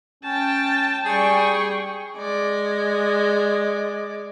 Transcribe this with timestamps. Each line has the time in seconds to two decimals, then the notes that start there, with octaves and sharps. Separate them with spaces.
0.24 C#4 G5 A5
1.05 G3 G#4 G5 C#6
2.17 G#3 D5